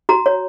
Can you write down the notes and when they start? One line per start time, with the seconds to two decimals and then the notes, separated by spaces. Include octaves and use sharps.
0.09 F#4 A#5
0.26 C#5